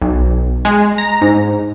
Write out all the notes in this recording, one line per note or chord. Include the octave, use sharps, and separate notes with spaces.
B1
G#3
A#5
G#2